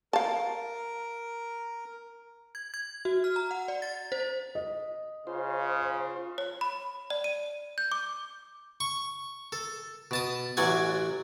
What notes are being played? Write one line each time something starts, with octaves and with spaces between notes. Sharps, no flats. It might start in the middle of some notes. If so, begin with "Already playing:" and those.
A#4 F5 A5
G#6
G#6
F#4
F6
A#5
F#5
D5
A6
C5
D#5
C#3 F4 C5
C#5
B5
D5
D#7
G6
D6
C#6
A4
B2 A5 D#6
A1 F#3 D5 F#5 G#5